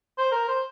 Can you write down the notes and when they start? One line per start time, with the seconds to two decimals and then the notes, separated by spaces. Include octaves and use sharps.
0.18 C5
0.31 A#4
0.48 C5